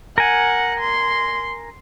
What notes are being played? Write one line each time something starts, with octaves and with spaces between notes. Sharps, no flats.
A#4 F#5 G#5
C6